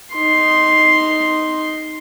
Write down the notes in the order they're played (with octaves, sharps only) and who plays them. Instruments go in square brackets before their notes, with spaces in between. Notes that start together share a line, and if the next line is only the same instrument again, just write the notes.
[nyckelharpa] D#4 C6